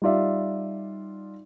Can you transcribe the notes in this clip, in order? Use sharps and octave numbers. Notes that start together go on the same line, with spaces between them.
G3 D#4 F4 D5 E5